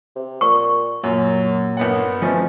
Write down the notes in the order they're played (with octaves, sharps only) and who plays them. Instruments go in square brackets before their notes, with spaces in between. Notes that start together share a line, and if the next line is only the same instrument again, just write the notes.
[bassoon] C3
[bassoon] A#2 [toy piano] C#6
[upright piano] F#2 [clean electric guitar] A#2 [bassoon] F#3
[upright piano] G1 B3 F#5 [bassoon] F#2
[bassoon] B2 [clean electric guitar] F3 A3 C#4